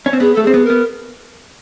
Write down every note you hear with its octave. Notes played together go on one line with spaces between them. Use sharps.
C#4
C4
B3 G#4
A3 A4
C4 G#4
B3
B3 A#4